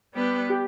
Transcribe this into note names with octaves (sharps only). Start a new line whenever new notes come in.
G3 B3 D4 G4 B4
G4